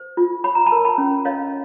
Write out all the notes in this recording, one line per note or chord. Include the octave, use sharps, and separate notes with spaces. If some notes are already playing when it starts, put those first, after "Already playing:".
Already playing: C5
F4
C#5 B5
A#5
A5 B5
A#4
A5 B5
C#4
C#5 D#5 F5